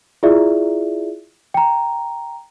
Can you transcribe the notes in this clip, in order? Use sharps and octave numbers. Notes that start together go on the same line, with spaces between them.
E4 F4 G#4 D5 E5
G5 A#5